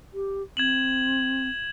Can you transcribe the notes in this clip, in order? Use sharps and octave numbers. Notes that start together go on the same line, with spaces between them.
G4
C4 G#6 E7 F#7